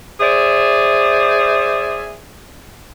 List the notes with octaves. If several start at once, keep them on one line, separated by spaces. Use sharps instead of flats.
G#4 C5 D5 E5